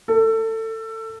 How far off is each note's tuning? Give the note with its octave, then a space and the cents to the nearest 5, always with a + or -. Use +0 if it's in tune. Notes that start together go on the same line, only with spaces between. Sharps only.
A4 +25